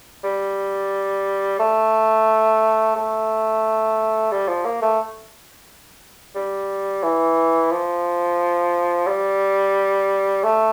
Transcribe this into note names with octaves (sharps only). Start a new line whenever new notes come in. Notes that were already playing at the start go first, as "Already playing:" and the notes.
G3
A3
A3
G3
F3
A#3
A3
G3
E3
F3
G3
A3